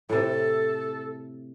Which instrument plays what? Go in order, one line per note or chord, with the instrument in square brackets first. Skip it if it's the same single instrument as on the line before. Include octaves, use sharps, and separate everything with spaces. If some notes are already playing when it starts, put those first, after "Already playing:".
[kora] A2 C3 [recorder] A4